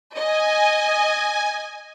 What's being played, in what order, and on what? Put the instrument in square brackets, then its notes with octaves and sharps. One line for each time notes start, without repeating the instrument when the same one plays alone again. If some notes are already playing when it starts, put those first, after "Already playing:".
[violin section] D#5 [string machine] G#5